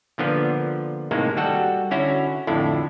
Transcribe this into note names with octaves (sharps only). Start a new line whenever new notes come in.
A#2 D3 F3 B3
A2 C3 D#3 G#3 A#3
G3 F#4 A4 F#5
D3 C#4 E4 F#4
F2 A2 D3 E4